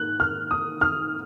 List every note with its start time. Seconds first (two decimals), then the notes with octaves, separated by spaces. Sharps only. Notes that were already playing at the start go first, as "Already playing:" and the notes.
Already playing: G#2 A#3 F#6
0.20 F6
0.51 D#6
0.81 F6